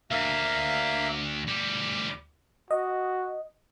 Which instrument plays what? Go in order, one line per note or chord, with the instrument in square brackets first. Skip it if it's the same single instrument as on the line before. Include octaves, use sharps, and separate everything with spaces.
[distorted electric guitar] D2 [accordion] A#3 E5 F5
[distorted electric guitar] D2 G3 [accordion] D6
[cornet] F#4 [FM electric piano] D#5